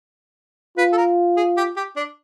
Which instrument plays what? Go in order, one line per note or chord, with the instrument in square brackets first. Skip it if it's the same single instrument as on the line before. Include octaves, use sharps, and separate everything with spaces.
[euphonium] F4 [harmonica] B4
[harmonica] A4
A#4
G#4
G4
G4
D4